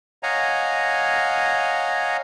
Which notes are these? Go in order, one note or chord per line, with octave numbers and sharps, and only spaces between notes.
C#5 D#5 F5 F#5 G#5 A#5